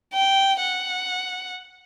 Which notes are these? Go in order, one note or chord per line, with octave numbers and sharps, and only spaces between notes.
G5
F#5